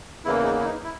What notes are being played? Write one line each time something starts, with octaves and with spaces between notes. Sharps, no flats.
E2 C#3 E3 A#3 E4
D#4
E4
D#4
E4